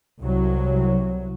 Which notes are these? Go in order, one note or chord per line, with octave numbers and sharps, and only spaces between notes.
C2 F#3